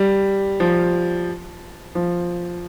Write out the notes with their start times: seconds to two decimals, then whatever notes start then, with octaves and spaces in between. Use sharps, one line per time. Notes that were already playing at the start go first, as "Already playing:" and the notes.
Already playing: G3
0.60 F3
1.95 F3